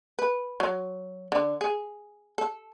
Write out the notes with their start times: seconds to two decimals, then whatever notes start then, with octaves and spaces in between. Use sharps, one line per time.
0.19 B4
0.60 F#3
1.32 D3
1.61 G#4
2.38 A4